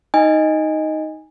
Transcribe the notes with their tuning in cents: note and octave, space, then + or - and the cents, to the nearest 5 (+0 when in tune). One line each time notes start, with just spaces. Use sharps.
D#4 +5 D#5 +0 G#5 -20